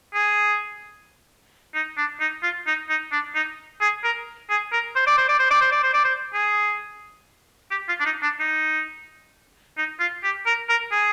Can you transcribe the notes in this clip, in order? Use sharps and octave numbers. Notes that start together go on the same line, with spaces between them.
G#4
D#4
D4
D#4
F4
D#4
D#4
D4
D#4
G#4
A#4
G#4
A#4
C5
D5
C5
D5
C5
D5
C5
D5
C5
D5
C5
G#4
G4
F4
D4
D#4
D4
D#4
D#4
F4
G4
A#4
A#4
G#4